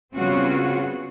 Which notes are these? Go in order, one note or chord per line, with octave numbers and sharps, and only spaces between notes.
C#3 G3 B3 C4 F4 F#4